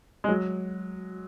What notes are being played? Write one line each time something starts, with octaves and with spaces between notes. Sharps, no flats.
G#3
F#3